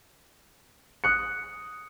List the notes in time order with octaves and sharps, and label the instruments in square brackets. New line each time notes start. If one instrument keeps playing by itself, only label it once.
[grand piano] D#6 F#6 C#7